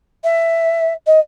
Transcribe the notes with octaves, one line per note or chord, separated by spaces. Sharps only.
E5
D#5